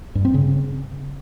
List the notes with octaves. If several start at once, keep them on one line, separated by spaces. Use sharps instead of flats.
G2
C4
C#3